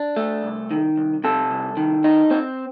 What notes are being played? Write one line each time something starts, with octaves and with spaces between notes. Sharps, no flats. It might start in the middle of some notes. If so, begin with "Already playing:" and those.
Already playing: D4
A3
C2
D#3
C2
C3 A4
C2
D#3
D#4
C4